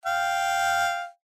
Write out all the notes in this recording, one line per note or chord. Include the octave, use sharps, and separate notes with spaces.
F5 G5